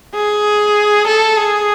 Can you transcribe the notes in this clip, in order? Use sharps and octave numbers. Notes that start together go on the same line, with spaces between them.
G#4
A4
G#4